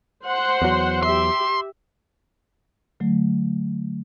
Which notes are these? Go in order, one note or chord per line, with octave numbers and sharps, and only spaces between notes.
C5 F#5 C6
E2 F#3
G4 E5 C6
D3 F#3 A3